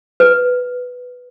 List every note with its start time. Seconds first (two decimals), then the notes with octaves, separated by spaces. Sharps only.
0.20 B4